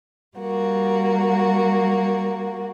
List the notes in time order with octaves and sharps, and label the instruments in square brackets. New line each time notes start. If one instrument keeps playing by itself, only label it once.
[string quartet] G3 A#3 F#4